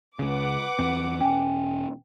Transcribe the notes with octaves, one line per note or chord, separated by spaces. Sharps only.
C#2 C#3 B4 F#5 D6
E2 C4
E1 C#4 G5 G#5